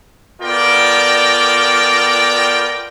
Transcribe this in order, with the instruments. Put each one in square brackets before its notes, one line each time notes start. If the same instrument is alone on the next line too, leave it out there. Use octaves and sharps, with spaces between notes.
[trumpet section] B3 F4 A4 A#4 D5 G5